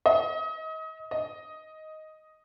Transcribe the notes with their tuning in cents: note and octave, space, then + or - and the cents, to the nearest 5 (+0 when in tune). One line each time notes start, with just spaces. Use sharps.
D#5 +30
D#5 +5